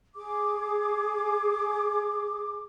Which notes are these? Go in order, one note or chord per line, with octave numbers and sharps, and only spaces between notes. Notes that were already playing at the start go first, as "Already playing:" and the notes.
G#4 D6